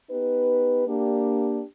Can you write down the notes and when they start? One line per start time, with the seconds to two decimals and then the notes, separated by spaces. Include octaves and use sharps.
0.10 B3 D#4 G4 B4
0.87 A#3 D4 G4